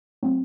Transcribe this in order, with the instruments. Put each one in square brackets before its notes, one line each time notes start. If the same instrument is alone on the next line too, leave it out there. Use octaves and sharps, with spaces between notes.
[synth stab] A2 F#3 C4